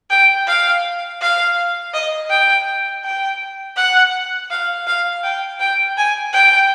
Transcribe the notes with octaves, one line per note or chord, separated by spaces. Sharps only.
G5
F5
F5
D#5
G5
G5
F#5
F5
F5
G5
G5
G#5
G5